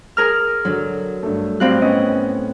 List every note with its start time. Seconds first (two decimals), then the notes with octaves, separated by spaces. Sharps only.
0.17 G#4 A#4 F6
0.65 D3 F#3
1.23 G2 A3
1.60 A2 F#3 G3 C4 F5 F#6
1.82 B3 C#4 D#5